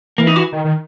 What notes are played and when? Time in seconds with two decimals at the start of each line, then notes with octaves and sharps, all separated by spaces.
0.18 E3 A#3
0.27 D#4
0.36 F#4
0.52 D#3
0.65 D#3